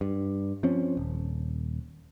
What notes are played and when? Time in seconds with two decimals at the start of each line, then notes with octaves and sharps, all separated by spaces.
0.01 G2
0.63 F3 C4 C#4
0.97 D#1